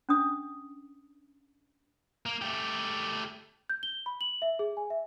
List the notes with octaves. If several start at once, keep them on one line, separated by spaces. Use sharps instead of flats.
C#4 D4 D#6
A#3
A3 G4
G6
G7
B5
F#7
E5
G#4
G#5
E5